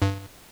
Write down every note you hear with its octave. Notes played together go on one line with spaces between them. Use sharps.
G2